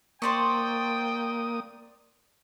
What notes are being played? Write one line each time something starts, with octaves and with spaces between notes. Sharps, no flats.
A#3 C5 D5 G5 C#6 D#6